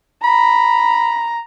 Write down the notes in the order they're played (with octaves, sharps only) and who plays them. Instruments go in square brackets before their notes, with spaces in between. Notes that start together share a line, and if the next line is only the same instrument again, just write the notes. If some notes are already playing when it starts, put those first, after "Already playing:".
[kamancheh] A#5 [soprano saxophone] B5